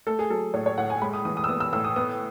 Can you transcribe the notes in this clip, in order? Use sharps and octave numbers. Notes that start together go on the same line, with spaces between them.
A3 A4
G#4
F#3 A4
A2 C#5
C#5
A2 F#5
G#5
G#3 B5
D#6
E3 D#6
D#6
E6
B3 D#6
E6
A2 E6
D#6
B3 D#6